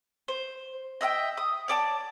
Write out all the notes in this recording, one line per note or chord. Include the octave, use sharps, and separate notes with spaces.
C5
D#5 E5 F#5 G5
D#6
C#5 D5 G#5 A5